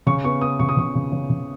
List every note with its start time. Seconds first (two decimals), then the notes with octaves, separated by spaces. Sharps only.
0.06 C#3 C#6
0.24 B3 C#6
0.41 B3 D#6
0.60 C#3 C#6
0.69 D#6
0.77 C#3 C#6
0.95 C#3
1.12 C#3
1.30 C#3